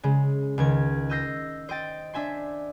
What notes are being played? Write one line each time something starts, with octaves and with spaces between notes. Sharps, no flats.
C#3 G#3
C#2 D#3 G#6
D#5 E6 G6 A#6 C7
C5 D#5 G5 A6
D4 E5 G#5 C6